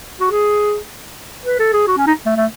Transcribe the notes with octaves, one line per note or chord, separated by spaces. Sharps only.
F#4
G#4
B4
A4
G#4
F#4
C#4
D#4
A3
A3